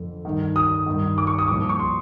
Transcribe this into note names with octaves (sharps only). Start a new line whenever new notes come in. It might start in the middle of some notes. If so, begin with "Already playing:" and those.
Already playing: F2 D3 F3
G2 D#3
D#6
G2 D#3
D6
C#6
D#6
C2 A#2 F3 D6
C#6
C6